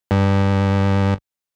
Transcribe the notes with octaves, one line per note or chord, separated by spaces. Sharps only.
G2